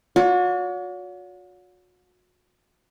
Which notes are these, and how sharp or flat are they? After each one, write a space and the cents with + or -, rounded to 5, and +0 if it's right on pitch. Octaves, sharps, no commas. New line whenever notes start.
F#4 -40 C#5 +45